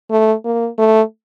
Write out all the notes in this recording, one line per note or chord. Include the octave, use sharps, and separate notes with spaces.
A3
A#3
A3